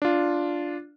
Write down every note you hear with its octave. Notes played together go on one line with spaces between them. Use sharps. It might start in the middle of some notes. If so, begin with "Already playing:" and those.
D4 F4